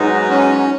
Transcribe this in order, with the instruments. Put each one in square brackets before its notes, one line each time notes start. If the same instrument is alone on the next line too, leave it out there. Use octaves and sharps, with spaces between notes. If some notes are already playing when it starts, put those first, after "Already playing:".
Already playing: [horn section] G#2 F#3 B3 D#4
[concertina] C#4